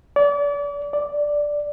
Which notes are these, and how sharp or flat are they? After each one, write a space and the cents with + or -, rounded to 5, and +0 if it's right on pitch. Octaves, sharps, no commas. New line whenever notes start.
D5 -35
D5 +0